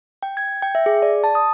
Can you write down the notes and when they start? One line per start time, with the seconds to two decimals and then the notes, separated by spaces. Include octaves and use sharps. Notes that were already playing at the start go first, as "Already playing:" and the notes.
0.23 G5
0.37 G#6
0.62 G5
0.75 E5
0.86 G#4
1.02 D5
1.24 A5
1.35 D#6